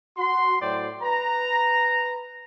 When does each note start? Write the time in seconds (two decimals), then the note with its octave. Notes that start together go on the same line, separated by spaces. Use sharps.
0.17 F#4 C6
0.61 A2 F#3 C5 D5 G5
1.01 B4 A#5